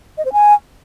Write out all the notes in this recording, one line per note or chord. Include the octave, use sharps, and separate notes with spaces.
D#5
C5
G#5